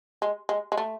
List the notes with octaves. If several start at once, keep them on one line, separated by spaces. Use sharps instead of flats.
G#3
G#3
G#3
A3